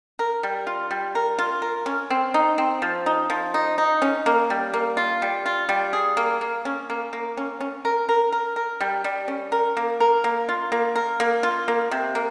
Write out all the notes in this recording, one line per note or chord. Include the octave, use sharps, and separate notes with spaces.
A#4
G3
F4
G3
A#4
F4
A#4
C#4
C4
D#4
C4
F3
D#4
F3
D#4
D#4
C#4
A#3
G3
A#3
F4
G3
F4
G3
G#4
A#3
A#3
C#4
A#3
A#3
C#4
C#4
A#4
A#4
A#4
A#4
G3
G3
C#4
A#4
A#3
A#4
A#3
F4
A#3
A#4
A#3
F4
A#3
C3
A#3